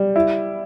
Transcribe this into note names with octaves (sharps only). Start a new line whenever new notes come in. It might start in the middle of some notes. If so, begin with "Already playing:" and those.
Already playing: G3
E4